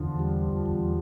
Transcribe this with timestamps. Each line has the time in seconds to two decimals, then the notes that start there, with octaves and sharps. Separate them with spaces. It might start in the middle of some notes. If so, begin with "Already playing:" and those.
Already playing: E2 D3 F3
0.19 G3
0.66 E2